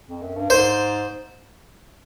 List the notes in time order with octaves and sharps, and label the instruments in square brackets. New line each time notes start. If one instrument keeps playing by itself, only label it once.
[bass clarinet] F2
F#2
G2
[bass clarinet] G#2 [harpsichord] C5